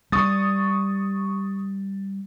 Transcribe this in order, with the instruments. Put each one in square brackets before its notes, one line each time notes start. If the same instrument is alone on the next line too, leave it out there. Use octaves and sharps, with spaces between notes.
[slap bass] G3 [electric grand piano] C#6 D#6 A6